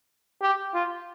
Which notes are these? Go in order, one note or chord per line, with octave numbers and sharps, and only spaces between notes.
G4
F4